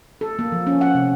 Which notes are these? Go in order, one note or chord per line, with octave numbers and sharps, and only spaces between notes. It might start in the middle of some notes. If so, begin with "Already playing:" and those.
A4
A#3
F3
C#4
F#5
C3